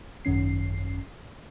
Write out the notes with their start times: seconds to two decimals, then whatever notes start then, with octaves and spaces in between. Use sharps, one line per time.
0.25 G#1 F#2 D#3 C#4 C7